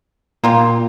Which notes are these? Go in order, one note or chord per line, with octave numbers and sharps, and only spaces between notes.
A#2 A#3 F4 G4